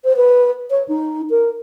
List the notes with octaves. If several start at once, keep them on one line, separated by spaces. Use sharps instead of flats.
C5
B4
C#5
D#4
A#4